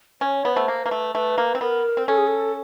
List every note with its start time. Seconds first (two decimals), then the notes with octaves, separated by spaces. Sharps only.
0.21 C#4 C#5
0.45 B3
0.53 A3 C5
0.68 A#3
0.83 A#3 B4
0.91 A3
1.15 A3 B4
1.38 A#3
1.55 C4
1.61 B3 A#4
1.97 C4
2.08 C#4 A4
2.18 G#4
2.27 A4